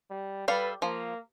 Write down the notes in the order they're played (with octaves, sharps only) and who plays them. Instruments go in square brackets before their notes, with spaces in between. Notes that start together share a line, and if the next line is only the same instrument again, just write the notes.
[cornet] G3
[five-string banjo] G3 A4 F5 [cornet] B4
[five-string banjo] F3 [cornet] A#3